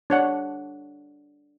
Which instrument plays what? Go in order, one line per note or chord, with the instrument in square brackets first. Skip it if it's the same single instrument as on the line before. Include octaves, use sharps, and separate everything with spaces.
[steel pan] D4 C#5 F#5